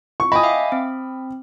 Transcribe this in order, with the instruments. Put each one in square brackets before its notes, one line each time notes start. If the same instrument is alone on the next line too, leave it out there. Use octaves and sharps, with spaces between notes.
[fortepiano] C#6
[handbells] D#5 G5 G#5 [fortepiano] B5 D#6
[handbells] E5 F5 D6
C4